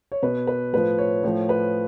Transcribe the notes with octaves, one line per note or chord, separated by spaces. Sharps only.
C#5
B2 B4
B4
A2 F3 B4
C#5
A2 F3 C#5
B4